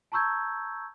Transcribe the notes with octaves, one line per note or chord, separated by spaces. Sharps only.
A5 A#5 C#6 E6 G6 G#6